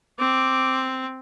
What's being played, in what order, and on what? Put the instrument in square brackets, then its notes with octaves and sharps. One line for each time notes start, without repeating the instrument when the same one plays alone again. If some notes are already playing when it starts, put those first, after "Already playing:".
[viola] C4 [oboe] D6